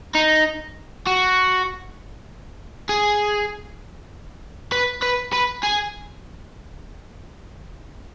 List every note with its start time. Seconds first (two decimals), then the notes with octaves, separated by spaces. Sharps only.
0.15 D#4
1.06 F#4
2.89 G#4
4.72 B4
5.03 B4
5.33 B4
5.63 G#4